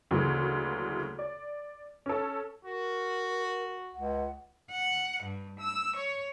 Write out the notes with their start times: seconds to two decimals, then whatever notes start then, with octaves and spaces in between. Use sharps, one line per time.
0.11 D2 C#3 E3 F#3 A#3
1.19 D5
2.06 C#4 A4
2.65 F#4 A#4
3.94 C#2 F#5
4.70 F#5
5.23 G2
5.59 E6
5.96 C#5